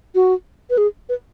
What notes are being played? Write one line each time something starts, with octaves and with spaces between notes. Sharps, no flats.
F#4
B4
G#4
B4